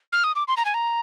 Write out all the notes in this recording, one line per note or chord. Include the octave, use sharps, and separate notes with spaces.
F6
D#6
D6
C6
A#5
G#5
A#5